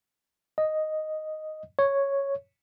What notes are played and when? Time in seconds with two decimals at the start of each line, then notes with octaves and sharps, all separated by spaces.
0.58 D#5
1.79 C#5